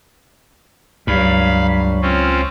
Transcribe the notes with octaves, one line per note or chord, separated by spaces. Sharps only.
C#2 G2 F#3 F5 B5
C4 C#4 F4